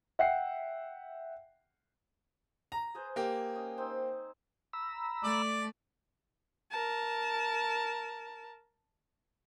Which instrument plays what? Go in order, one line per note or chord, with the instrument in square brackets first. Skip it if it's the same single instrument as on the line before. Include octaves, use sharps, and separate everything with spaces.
[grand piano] E5 F#5 G5 C7
A#5
[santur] G#4 B4 C5
[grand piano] A#3 G4
[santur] C#4 D#5
C4 D#4 C5
[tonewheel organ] A#5 B5 E6
[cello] A3 [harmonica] D5
[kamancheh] A#4 A5